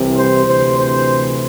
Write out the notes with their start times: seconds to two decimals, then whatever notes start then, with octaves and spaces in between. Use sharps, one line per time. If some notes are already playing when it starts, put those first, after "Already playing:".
Already playing: C2 C3 E3
0.16 C5
0.46 D2 C3 E3 C5
0.77 C5